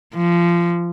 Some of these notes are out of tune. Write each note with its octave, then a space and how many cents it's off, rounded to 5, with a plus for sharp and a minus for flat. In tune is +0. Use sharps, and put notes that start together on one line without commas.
F3 -20